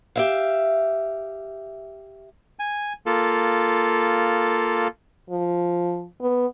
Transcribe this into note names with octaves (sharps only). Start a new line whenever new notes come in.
G4 E5 F5
G#5
A#3 F4 A4
F3
B3